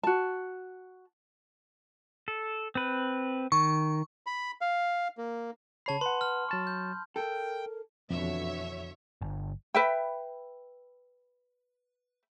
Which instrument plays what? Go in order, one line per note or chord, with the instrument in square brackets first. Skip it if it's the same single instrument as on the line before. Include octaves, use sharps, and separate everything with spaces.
[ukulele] F#4 A5
[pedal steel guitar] A4
C4 B4
[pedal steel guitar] D#3 [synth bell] C#6
[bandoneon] B5
F5
A#3
[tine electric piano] C#3 C#5 C7 [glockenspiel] A5 B5
[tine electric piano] B4 F#5 [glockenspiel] C6
[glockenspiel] F6
[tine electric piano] F#3 A5 C#6
[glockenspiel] G6
[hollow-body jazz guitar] A4 [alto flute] A#4 [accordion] G5
[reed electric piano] F2 [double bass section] B2 D3 E3 [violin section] C#5 E5
[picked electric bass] G1
[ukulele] B4 E5 G5